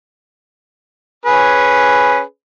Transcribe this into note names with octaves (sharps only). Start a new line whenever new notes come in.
C#4 G#4 B4